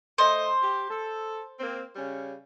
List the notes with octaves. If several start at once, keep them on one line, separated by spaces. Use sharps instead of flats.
A3 C5 D#5
G4
A4
A#3 C4
C#3 G3 C#4